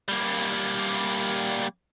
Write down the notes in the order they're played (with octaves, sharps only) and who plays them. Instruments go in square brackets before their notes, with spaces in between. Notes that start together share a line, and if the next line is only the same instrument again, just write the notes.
[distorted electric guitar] G3 A#3